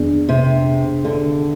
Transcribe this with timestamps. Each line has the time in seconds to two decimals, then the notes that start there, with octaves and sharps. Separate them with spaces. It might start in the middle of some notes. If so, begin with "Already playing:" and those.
Already playing: F2 D#3 B3 D4 G#4
0.29 C3
1.05 D3